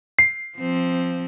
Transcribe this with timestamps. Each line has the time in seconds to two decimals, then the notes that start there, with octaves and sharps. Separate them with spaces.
0.19 C7
0.58 F3 C4